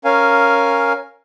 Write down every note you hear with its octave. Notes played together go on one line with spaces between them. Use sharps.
C#4 A#4 F5 G#5